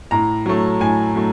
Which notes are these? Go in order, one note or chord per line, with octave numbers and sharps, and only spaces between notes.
A2 A#5
F#3 A3
A2 G#5
F#3 A3